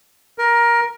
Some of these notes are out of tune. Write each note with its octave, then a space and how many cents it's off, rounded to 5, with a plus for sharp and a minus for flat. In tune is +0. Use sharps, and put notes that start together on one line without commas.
A#4 +15